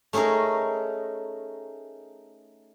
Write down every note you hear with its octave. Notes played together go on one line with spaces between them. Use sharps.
A3 C#4 D#4 G#4 A#4